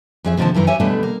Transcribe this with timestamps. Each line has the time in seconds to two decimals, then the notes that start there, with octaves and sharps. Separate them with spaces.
0.25 F2 G#4 E5
0.37 D2 C3 D#3 F3 A#3 A5
0.55 F#2 D#3 E3 A#4
0.67 G4 C#5 E5 F#5 G#5
0.80 B2 D3 G3 A3
1.03 A#3